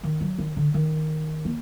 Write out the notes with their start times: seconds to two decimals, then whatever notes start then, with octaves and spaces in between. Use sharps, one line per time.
0.03 D#3
0.21 F#3
0.39 D#3
0.57 D3
0.74 D#3
1.45 A#3